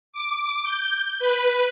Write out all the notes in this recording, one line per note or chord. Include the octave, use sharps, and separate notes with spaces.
D6
G6
B4